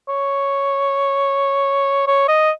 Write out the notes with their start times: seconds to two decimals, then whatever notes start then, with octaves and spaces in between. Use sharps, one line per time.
0.09 C#5
2.07 C#5
2.28 D#5